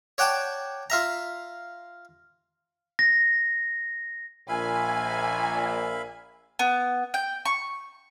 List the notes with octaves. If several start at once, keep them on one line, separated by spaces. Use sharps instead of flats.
C#5 D5 F#5 G5 A5
F4 E5 A#5
A#6
A#1 A#2 E5 F5 G#5 B5
B3
G5
C#6